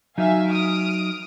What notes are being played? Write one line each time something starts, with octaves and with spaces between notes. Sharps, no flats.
F#3 D#4 E5 F5 G#5
D#6 F6 D7